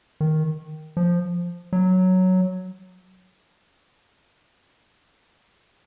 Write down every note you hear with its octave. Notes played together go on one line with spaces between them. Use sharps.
D#3
F3
F#3